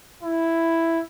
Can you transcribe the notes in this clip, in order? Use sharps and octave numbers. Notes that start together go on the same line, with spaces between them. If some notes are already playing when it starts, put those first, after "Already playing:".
E4